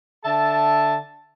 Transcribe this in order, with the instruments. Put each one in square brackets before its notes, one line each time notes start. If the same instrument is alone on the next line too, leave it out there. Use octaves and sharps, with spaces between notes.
[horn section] D3 E5 A5